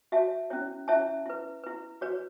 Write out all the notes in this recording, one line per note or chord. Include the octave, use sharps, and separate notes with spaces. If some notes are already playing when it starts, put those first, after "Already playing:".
F#4 C#5 E5 A5
C#4 E4 C#5
C#4 E4 C#5 E5 A5
E4 B4
E4 B4
F#4 B4 C#5